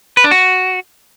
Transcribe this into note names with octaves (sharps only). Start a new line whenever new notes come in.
B4
D4
F#4